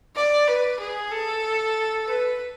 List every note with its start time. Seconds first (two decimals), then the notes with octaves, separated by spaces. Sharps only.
0.16 D5
0.48 B4
0.80 G#4
1.12 A4
2.07 B4